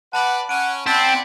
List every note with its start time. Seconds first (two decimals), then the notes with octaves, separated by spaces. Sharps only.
0.13 B4 D5 F#5 A5 B5 F#7
0.49 C#4 F#5 D7 D#7
0.87 C4 E4 D5 F#5 A5 B6